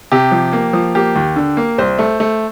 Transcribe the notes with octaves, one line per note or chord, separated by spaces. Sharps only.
C3 G4
F3
A#3
F3
A#3 G4
D#2
D3
A#3
C2 C5
A3
A3